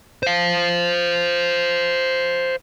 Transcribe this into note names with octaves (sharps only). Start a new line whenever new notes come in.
C5 F5